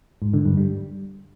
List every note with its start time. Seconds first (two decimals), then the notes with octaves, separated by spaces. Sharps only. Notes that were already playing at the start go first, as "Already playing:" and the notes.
0.22 G#2
0.34 D3
0.45 G2
0.57 G3